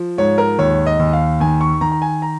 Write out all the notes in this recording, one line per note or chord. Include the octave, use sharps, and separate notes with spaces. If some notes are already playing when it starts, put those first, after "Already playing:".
Already playing: F3
G#2 C#5
A#4
D#2 C#5
D#5
D#2
F5
D#3 G#5
C#6
D#3 A#5
A#5
G#5
A#5